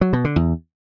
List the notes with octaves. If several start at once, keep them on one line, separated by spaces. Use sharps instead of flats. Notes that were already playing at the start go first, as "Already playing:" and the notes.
F#3
B2
D3
E2